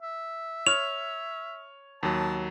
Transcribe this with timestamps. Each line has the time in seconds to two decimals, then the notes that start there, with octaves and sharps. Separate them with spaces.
0.02 E5
0.67 C#5 F6 F7
2.03 D#2 F#3 A5